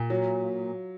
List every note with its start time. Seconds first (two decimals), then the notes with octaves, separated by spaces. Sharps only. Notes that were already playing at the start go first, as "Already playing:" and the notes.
Already playing: A#2
0.10 F#3